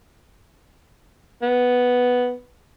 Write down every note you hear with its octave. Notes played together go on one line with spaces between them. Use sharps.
B3